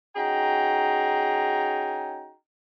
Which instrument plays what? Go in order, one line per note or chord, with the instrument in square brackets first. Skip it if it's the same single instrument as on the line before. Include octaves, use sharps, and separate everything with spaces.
[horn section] C#4 D#4 F#4 G#4 G5 A#5